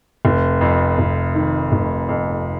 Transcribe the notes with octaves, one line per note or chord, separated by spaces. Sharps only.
F1
F2
F1
D#3
F1
F2